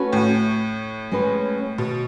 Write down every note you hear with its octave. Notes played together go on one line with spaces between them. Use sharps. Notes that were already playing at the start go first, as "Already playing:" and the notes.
Already playing: A3 C#4 F#4 B4
A2
G#3 C#4 G#4 B4
B2